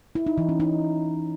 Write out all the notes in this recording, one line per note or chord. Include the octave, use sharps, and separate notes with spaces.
E4
D#4
E3
C#4
D#4